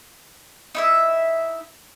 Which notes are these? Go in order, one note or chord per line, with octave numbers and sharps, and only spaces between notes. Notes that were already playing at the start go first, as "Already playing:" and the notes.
D#4 E4 E5